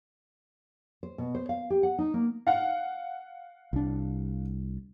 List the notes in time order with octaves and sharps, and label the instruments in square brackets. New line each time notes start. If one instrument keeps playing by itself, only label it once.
[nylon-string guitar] C5
B2
C5
F5
G4
F#5
D#4
A#3
[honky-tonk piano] F5 F#5
[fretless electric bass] C2 D4